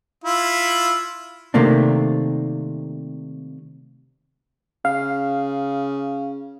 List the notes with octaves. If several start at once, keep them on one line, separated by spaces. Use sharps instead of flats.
E4 F4
C3 D#3 A3 A#3 C4 D4
C#3 F5